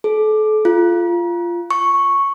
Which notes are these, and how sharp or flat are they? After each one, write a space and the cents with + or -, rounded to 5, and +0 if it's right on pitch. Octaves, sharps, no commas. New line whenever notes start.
A4 -35
F4 -15
C#6 -5